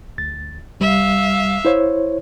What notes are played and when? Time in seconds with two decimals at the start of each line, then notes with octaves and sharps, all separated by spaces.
0.18 D2 A6
0.80 C2 G3 E5 F5
1.65 E4 C5 C#5